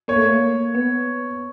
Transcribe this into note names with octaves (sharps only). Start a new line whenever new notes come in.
A#3 C#5
A3
A#3
B3